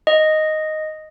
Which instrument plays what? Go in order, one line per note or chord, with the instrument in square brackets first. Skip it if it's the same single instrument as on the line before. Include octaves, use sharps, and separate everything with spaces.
[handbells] D#5